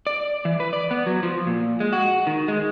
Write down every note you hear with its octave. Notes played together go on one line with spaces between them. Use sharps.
D5
E3
B4
D5
B3
F#3
F3
A#2
G#3
F#4
D#3
G#3